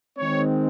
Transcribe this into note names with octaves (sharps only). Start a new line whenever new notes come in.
D#3 G#3 C4 C#5